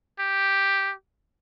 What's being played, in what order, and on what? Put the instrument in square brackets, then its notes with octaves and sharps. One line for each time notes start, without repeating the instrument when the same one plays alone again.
[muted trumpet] G4